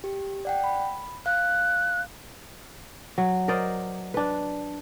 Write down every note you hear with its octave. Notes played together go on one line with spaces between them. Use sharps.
G4
D5 F#5 G5
B5
F5 F#6
F#3
A#4 C5 D5 D#5
D4 B4